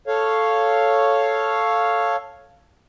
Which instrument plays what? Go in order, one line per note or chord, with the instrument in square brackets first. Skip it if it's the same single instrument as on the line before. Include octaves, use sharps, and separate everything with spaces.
[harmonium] A4 C#5 F5